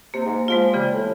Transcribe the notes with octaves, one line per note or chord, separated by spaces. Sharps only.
C3 A#3
G#2
F3 G#3 B3 F4
C#3 E3 G3
A2